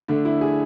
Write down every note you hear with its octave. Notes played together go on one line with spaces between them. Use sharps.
D3 A3 D4
E4
G#4